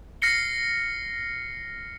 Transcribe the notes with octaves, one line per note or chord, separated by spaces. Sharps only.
F6 A#6 C7 C#7 G7